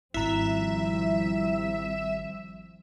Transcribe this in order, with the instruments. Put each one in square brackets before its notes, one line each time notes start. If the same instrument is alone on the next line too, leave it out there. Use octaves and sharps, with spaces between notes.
[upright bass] G#1 D#3 [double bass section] F3 G3 C4 [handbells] E4 A#5 [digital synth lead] E5